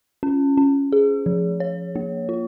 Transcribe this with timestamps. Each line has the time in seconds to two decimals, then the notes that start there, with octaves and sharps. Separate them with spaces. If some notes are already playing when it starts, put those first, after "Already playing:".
0.23 C#4
0.57 C#4
0.92 G#4
1.26 F3
1.60 C#5
1.96 A#3
2.29 F4